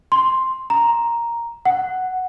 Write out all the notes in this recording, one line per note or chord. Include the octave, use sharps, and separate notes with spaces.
C6
A#5
F#5